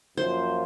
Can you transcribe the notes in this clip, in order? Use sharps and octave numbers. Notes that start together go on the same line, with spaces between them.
F#2 F3 A#3 F4 C5